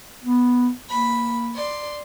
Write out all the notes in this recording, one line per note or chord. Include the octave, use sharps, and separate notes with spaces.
B3
A#3 B5
D5 C6